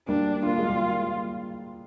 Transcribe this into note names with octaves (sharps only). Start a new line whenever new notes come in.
G3 A#3 D4
A#3 F4
G#3
G3 A#3